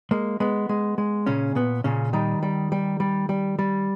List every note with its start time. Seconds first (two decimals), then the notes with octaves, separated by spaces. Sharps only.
0.11 G#3 A#3
0.40 G#3 B3
0.69 G#3
0.98 G#3
1.26 A#2 C#3 C#4
1.55 A#2 B3
1.84 A#2 C#3 C#4
2.13 D#3 G3 D#4
2.43 G3
2.72 G3
3.00 G3
3.29 G3
3.59 G3